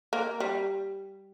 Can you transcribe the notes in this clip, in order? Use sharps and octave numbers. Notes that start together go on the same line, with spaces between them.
A#3
G3